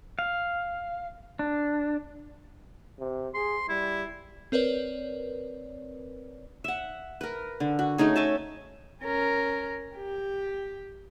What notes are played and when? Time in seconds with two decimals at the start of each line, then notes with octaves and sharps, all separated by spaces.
0.19 F5
1.39 D4
2.99 C3
3.34 G#4 C6
3.69 G3 E4
4.52 C4 A#4 B4 C#5 D5
6.64 E5 F#5
7.21 A#4 B4
7.60 D3
7.79 F#4
7.98 A3 C#4 D#4 G#4
8.16 C#5 D#5 E5 A5
9.02 C#4 A#4
9.95 G4